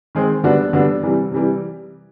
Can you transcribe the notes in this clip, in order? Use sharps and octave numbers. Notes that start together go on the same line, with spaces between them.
D#3 G#3 C4
D3 G3 B3 D4 F#4
D3 G3 B3 D4 F#4
C3 E3 G3
C3 E3 G3